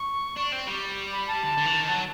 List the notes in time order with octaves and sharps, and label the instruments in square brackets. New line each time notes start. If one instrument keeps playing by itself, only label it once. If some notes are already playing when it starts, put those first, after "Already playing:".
Already playing: [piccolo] C#6
[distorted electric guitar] D4
C4
G3
[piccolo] B5
A5
[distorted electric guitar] D3
D3
E3
D#3
F#3